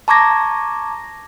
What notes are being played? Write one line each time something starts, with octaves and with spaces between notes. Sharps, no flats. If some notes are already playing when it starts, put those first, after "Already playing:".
A5 A#5 C#6 D6 G#6 A#6